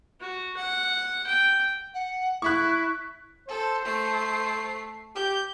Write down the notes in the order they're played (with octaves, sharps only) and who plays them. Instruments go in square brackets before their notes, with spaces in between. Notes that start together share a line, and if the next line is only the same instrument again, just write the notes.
[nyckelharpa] F#4
F#5
G5
[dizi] F#5
[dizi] E4 [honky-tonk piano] C#6 F#6
[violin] A4 [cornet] C5
[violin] A3 C7
[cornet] G4 [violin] G6